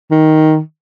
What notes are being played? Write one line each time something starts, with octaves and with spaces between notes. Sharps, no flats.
D#3